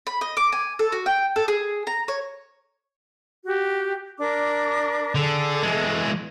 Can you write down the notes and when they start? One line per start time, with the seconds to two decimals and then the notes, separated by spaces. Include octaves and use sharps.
0.07 B5
0.21 D#5
0.37 D6
0.52 G#5
0.79 A4
0.92 F#4
1.06 G5
1.36 A4
1.48 G#4
1.87 A#5
2.08 C#5
3.45 F#4 G4
4.19 D4 A#4 D6
5.15 D3 G#4 A4
5.63 E3 G#3